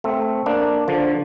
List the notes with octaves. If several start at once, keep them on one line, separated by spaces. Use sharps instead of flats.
A3 C4
A#3 D4
D3 F3